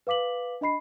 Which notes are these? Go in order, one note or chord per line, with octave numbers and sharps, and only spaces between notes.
B4 F5 D6 B6 F#7
D4 D#5 B5 C7